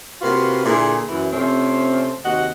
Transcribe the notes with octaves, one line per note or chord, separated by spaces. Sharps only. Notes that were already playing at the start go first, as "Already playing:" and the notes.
C3 A#3 F4 F#4 B4
A#2 D3 D4 E4 G#4
F#2 E3
C3 F3 A3 C4 C#4
D#2 C3 F#4 D#5 F#5